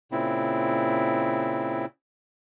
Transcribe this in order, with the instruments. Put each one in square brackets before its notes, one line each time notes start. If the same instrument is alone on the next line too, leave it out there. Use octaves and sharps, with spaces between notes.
[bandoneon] A#2 C#3 C4 E4